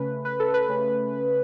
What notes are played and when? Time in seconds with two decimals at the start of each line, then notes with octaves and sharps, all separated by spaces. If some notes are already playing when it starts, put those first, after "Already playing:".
Already playing: C#3 A3 C#4 B4
0.25 B4
0.40 A4
0.54 B4
0.69 C#3 A3 C#4